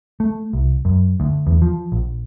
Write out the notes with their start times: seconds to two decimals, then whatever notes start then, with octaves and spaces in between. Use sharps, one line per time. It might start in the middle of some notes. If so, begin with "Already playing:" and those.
0.20 A3
0.53 C2
0.85 F#2
1.20 D2
1.47 E2
1.62 F3
1.92 A#1